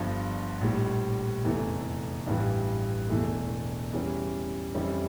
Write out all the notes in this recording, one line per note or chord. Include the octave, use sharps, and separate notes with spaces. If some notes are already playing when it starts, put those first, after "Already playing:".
Already playing: G1 G2 F3
A#1 A2 G3
F1 E2 E3 A3
A1 G2 E3 G3
E1 E2 E3 A3
E2 E3 G3 C#4
F2 E3 G3 C#4 E4